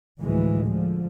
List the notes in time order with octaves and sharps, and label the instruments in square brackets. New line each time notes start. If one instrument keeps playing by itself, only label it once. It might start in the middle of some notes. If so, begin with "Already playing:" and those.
[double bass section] D2 A2 E3 F3 G#3
D3 F3